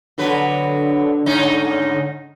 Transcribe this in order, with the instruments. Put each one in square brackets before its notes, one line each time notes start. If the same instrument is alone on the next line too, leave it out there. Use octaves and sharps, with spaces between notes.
[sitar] B2 F#3 B4 [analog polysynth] D3
[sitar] G#2 C#4 D#4